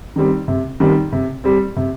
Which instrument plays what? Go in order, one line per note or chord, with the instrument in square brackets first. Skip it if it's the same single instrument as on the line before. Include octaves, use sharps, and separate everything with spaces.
[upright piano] D#3 G3 C4
C3
D#3 G3 C4
C3
G3 C4
C3